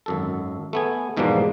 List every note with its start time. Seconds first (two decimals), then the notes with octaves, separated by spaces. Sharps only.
0.06 G#1 F#2 A4
0.73 A3 B3 G#5
1.17 E2 G#2 B2 F3 G3 A#3